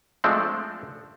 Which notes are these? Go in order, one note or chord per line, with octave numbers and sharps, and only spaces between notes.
F3 G#3 A3 C4 D4